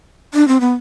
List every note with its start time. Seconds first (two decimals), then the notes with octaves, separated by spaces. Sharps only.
0.34 D4
0.48 C4
0.60 B3